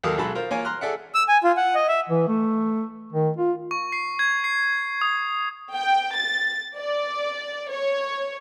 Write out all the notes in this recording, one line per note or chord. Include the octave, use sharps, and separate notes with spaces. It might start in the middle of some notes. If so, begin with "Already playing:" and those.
D#2 F#3 A4 A#4 F5 D#6
B1 F#3 G#3 A4 A5 B5
F4 A#4 C5
A#3 F4 C#5 G#5
A#5 C6 F6 F#6
G#4 A4 D5 E5 F#5
E6
G#5
F4
F#5
D#5
E5
E3
A3
D#3
F4
C#6
C7
G#6
C7
D#6
G5
A6
D5
C#5